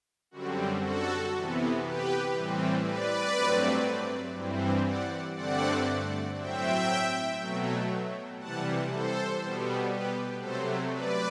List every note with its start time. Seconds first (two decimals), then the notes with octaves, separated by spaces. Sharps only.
0.31 F#2 D3 G3 C4 F#4
0.82 F#4 A4
1.32 C3 E3 B3
1.82 G4 B4
2.33 A2 E3 G3 C4
2.84 B4 D5
3.34 G2 F#3 A3 C4
4.35 G2 E3 G3 C4
4.86 D5 F#5
5.36 G2 D3 A3 C4 D5 F#5
6.37 A2 F#3 C4 E5 G5
7.39 B2 F#3 A3
8.39 C3 E3 G3 F#5 A5
8.90 A4 C5
9.41 B2 G3 B3
9.91 G4 B4
10.41 C3 F#3 A3 A4 C5
10.91 B4 D5